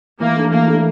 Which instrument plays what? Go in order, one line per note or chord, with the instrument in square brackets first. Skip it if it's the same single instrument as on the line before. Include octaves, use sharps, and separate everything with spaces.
[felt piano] E3 [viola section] A#3
[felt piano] A3 D4 A4
[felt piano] E3 [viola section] A#3
[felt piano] A3 D4 A4